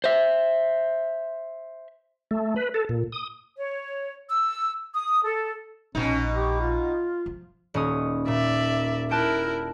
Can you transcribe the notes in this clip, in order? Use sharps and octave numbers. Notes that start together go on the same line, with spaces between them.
C5 E5
A3
B4
A4
A#2
D#6
C#5
E6
D#6
A4
A#1 B2 C#4 D#4
G4
F4
F3
D#1 C#4 D#6
A#2 D5 E5
E4 A#4 G5 A5 F#6